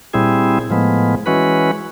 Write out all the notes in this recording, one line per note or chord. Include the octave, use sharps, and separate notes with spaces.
A#2 G3 C4 E4 G#4
A2 F3 G#3 B3
E3 G#3 C#4 F#4 B4